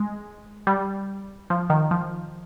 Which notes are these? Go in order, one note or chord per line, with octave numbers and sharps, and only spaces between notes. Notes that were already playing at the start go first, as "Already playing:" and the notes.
Already playing: G#3
G3
F3
D#3
F3